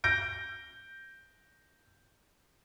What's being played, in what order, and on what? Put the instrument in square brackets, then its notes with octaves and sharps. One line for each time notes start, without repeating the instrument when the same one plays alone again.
[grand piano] G6 A#6 D7